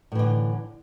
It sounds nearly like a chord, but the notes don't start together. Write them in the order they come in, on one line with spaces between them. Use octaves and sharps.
A2 E3 D3